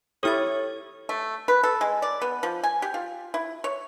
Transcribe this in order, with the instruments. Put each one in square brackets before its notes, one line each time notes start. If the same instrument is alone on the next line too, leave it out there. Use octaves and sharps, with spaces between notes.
[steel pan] E4 G4 D#6 [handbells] A4 F6 A6 [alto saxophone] C#5
[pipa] A3
B4
A4
G#3
D5
B3
F3
G#5
G4
F4
E4
C#5